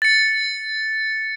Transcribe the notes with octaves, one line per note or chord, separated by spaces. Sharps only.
A6 C#7